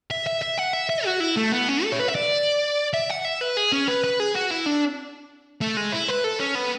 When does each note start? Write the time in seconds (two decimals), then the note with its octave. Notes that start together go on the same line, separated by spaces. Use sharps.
0.11 E5
0.27 E5
0.42 E5
0.58 F#5
0.73 E5
0.89 E5
1.05 F#4
1.20 E4
1.37 A3
1.52 B3
1.68 C#4
1.84 A4
1.92 C#5
1.99 B4
2.08 E5
2.15 D5
2.94 E5
3.10 F#5
3.25 E5
3.41 B4
3.57 G#4
3.72 C#4
3.88 B4
4.04 B4
4.20 G#4
4.35 F#4
4.51 E4
4.66 D4
5.61 A3
5.77 G#3
5.92 E4
6.08 B4
6.24 A4
6.40 C#4
6.55 B3